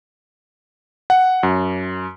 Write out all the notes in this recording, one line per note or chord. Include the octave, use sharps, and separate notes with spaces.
F#5
F#2